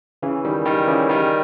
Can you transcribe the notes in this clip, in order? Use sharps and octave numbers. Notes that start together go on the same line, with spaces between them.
C#3 E3
D#3 G3
D#3 G3
C#3 E3
D#3 G3